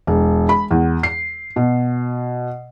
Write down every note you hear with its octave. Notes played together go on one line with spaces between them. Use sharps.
E1
B5
E2
C7
B2